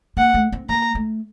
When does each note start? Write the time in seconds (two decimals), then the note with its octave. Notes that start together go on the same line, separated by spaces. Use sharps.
0.17 A#3 F#5
0.34 A3
0.52 C4
0.69 A#3 A#5
0.95 A3